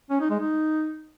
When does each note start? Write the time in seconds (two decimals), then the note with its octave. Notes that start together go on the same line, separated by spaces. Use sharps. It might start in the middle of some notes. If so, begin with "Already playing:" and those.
0.10 C#4
0.20 D#4
0.30 G#3
0.40 D#4